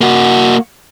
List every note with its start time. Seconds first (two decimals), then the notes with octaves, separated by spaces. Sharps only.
0.01 A#3 F#4